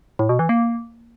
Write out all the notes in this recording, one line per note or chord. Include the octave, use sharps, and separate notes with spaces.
A2
B2
E3
A#3